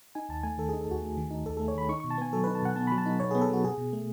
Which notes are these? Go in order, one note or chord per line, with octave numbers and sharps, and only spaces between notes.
D#4 G#5
D#2 A5
A3 G#5
D#3 A4
D#4 G#4
A4
D#2 F#4
A3
D#3
D#4
D#2 A4
A3 A4
C#5
D#3 B5
D#4 C#6
B2 C#6
A5
B3 G#5
F#3 A4
D#4 B4
A5
B2 F#5
B3 A5
F#3 B5
A5
D#4
B2 C#5
B3 G#4
A4
F#3 F#4
B2 G#4
B2
A3